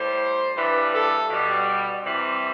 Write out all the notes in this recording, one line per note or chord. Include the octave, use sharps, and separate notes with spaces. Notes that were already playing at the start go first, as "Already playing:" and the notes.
Already playing: A2 G3 C5
G2 E3 G3 B4
A4
B2
G3
C3 E3 G3 C4